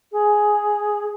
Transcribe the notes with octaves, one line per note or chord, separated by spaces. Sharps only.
G#4